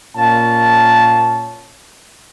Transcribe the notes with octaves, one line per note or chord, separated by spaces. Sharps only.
A#2 A#3 C#4 F5 A5